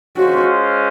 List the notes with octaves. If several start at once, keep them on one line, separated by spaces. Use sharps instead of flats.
G#3 C#4 F4 F#4 C5